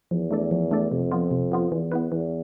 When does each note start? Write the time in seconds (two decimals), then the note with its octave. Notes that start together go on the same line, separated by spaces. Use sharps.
0.11 E2 F3
0.31 A3 D4 A4 D5
0.51 F3
0.71 A3 D4 A4 D5
0.91 F2 C3
1.12 F3 B3 F4
1.31 C3
1.52 F3 B3 F4
1.71 E2 E3
1.92 B3 E4 B4
2.12 E2 E3